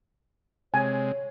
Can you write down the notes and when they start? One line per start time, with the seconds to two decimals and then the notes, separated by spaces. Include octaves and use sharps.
0.74 C3 G#3 C#5 G#5